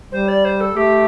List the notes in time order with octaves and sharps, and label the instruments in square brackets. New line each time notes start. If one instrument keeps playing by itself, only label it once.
[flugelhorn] G3 [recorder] C5
[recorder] D5
C5
A4
[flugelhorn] A3 [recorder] G4